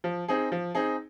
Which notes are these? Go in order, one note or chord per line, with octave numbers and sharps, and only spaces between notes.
F3
C4 D#4 G#4
F3
C4 D#4 G#4